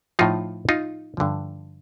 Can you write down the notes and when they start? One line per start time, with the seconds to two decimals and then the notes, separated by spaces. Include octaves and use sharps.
0.19 A2 F3 D#4 F4
0.69 D#4 F4
1.17 G2 D3 F3